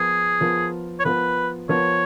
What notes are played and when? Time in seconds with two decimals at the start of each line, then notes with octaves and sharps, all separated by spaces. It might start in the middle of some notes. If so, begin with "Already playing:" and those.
Already playing: F3 B3 F4 G#4 A#4
0.40 F3 B3 F4 A#4
0.99 C#5
1.05 F3 B3 F4 A#4 B4
1.69 F3 B3 F4 A#4 C#5